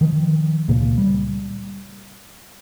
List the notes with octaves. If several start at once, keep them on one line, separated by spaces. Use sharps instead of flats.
D#3 F3
C#2 A#2 C#3 A#3
G3